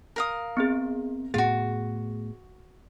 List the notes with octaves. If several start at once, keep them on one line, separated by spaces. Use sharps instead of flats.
A#4 F5 D#6
B3 C4 G#4
A2 A3 B3 F4 F#4 G#4